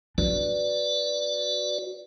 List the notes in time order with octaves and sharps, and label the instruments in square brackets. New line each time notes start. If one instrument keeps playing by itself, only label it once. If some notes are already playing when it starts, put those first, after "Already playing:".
[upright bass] D4 [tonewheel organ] F#4 B4 D5